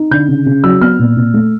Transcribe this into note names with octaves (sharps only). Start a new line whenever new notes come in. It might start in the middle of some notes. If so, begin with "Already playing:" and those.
Already playing: D#4
D3 G6
C#3
C#3
F#3 E6
B3 F6
A#2
A#2
A3